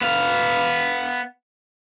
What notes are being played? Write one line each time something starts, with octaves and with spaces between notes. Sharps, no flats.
B3 F5